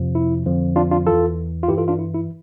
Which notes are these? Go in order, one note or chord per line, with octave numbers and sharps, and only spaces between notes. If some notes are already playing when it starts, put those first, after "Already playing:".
Already playing: F2 C3 F3
E4
F2 D3 F3
D4 F4
D4 F4
E2 E3 F4 A4
F4
G2 E3 E4 G4
F4 A4
D4 F4
E4
E4